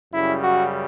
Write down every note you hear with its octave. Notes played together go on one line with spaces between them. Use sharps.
F#2 C#3 G3 E4
F#4